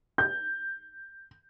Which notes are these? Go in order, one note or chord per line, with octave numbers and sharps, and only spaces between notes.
G6